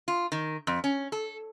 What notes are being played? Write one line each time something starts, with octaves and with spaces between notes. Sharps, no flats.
F4
D#3
F2
C#4
A4